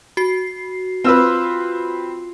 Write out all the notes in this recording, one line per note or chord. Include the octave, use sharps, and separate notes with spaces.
F#4 C7
C4 F4 B4 E6